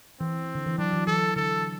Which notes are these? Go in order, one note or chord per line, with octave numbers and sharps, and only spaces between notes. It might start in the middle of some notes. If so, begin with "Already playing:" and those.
E3 C4
D3
E3
F#3 D4
E3
E3 A4
D3 A4